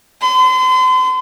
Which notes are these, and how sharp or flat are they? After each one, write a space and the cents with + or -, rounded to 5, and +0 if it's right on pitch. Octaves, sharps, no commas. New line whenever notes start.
C6 -40